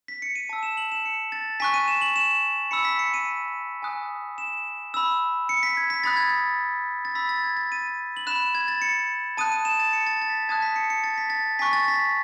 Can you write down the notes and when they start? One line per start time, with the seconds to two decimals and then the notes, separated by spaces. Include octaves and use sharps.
0.08 B6
0.22 C#7
0.36 D#7
0.49 A5 E6
0.63 E7
0.77 F#7
0.92 E7
1.06 C#7
1.32 A6
1.60 G#5 C#6 F#6 B6
1.74 D#7
1.88 E7
2.01 F#7
2.16 E7
2.71 B5 E6 C#7
2.85 B6
2.99 C#7
3.14 D#7
3.82 G#5 D#6 F#6
4.38 E7
4.94 B5 E6
5.49 C#7
5.63 B6
5.77 G#6
5.90 B6
6.04 B5 D#6 F#6 A6
6.17 G#6
6.30 A6
7.05 A6
7.15 B5 E6 B6
7.29 A6
7.44 G#6
7.57 A6
7.72 D#7
8.17 F#7
8.27 B5 F#6 E7
8.55 G#6
8.68 A6
8.82 C#7
9.37 A5 D#6 F#6 D#7
9.52 D#7
9.65 E7
9.80 A6
9.93 C#7
10.07 A6
10.22 A6
10.30 B6
10.34 A6
10.49 A5 D#6 F#6 G#6
10.62 B6
10.76 C#7
10.90 C#7
11.04 A6
11.18 B6
11.30 A6
11.59 G#5 C#6 F#6 B6
11.73 A6
11.88 B6